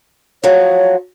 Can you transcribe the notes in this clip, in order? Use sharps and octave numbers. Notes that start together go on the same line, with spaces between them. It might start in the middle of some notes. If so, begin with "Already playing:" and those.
F3 F#3 C#5